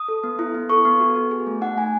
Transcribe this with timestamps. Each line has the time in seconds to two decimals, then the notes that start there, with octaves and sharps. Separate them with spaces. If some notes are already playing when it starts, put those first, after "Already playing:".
Already playing: D#6
0.08 A4
0.24 B3
0.39 E4
0.54 B3
0.69 A4 C#6
0.85 B3
1.00 F#4
1.15 B3
1.31 G#4
1.47 A3
1.61 D#4 F#5
1.77 A3 G#5